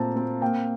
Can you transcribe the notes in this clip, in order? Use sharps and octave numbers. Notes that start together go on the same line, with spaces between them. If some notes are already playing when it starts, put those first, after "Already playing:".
Already playing: A#2 A3 C4 A5 A#5
C4
A#3 G5